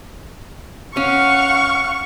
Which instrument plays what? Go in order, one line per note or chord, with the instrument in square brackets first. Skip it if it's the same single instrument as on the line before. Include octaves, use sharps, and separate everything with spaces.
[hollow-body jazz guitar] C#4 [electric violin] F5 F#5 [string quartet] C#6